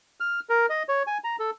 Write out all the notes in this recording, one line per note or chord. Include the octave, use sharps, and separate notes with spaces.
F6
A#4
D#5
C#5
G#5
A#5
A4